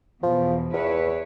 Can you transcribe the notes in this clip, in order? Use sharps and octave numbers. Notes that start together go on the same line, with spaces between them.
E2 B2 F3
E2 E4 B4 C#5